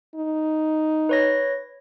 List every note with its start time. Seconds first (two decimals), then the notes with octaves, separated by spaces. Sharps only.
0.15 D#4
1.09 B4 C#5 A#6